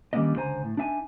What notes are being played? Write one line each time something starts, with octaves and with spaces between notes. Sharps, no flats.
D#3 G3 A#3 C#4 D4 D#5
C#2 D3 C5 G#5 A#5
A2
D4 D#4 E5 F5 G#5